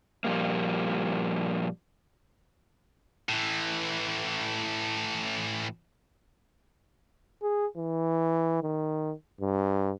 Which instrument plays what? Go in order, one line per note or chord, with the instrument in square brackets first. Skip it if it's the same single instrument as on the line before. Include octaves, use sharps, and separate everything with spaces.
[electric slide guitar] A#2 F3 G3 A#3
[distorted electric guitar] A2 E3
[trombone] G#4
E3
D#3
G2